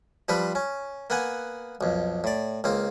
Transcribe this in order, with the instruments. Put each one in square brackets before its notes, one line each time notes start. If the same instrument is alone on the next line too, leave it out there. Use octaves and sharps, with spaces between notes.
[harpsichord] F3 G3 C4 B4
C#4
A#3 B3 F#5 G#5
B1 F2
A2 D5
C#2 A#3 C4